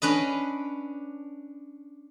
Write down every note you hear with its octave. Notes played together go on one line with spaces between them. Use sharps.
C#4 D4 B4 D#5